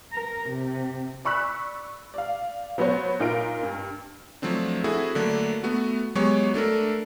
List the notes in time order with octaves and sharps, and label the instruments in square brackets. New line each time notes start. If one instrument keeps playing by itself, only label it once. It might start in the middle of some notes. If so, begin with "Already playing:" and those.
[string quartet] A#4
C3
[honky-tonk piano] D5 B5 C#6 E6 F#6 B6
D5 F5
F#3 B3 F#4 C5 C#5
A#2 D#4 F4 A#4 D7
G2
[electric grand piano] F3 F#3 A3 C4 D4
C4 E4 F#4 G#4 A4
D3 F#3 A3 A#3 D4
A3 B3 F#4
F#3 G#3 B3 G4 C#5 C#6
A3 D4 A4 A#4